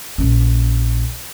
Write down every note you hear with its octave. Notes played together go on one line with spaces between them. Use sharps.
A#1 C#4